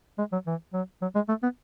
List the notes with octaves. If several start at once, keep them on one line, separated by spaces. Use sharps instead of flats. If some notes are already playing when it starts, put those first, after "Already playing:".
G#3
F#3
E3
F#3
F#3
G#3
A3
B3